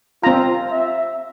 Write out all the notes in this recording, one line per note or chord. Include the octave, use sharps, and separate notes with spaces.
C4 F4 A#5
E5